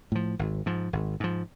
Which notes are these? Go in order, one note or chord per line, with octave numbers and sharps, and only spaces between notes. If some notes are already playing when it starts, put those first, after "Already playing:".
A2 F3
G#1
G#2 F3
G#1
G#2 F3